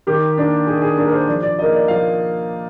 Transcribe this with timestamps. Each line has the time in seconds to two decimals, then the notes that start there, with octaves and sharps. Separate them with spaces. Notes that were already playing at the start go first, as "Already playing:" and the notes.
0.07 D#3 G4
0.38 A#3 D4
0.67 D#3 G#4
0.82 G#4
0.97 A#3 D4
1.08 A#4
1.13 C5
1.28 F3 D5
1.43 D5
1.58 A#3 D#4 D#5
1.74 D5
1.88 F3 F5